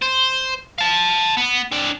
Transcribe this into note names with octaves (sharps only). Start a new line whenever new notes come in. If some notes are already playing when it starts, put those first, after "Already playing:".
C5
F5 A5
B3
C4 D4